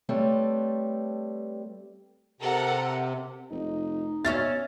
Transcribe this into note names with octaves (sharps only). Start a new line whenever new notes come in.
G3 A3 C4 A4 B4 C#5
C3 A4 A#4 F#5
F1 D#4
B2 C#4 E5 F5 A6